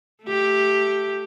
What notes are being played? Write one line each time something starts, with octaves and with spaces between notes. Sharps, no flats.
A3 G4